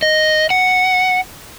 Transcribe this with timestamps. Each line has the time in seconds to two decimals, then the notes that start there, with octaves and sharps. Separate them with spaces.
0.02 D#5
0.50 F#5